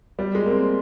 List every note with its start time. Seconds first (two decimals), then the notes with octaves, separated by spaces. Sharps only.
0.19 G3
0.35 G#3
0.46 A#3
0.51 C4